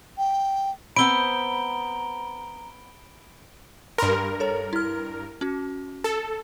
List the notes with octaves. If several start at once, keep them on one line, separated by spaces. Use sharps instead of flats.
G5
B3 C4 C5 A#5 B5 D7 G7
G2 A#4 B5 C6 F6
A4 C#5 A#5
E4 F6
C#4 F#4
A4